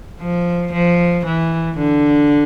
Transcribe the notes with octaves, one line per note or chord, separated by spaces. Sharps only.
F3
F3
E3
D3